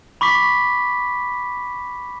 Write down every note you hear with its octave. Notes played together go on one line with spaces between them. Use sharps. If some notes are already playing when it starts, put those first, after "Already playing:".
B5 C#6 D6 B6